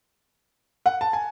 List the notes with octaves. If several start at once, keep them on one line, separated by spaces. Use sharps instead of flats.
F#5
A5
G#5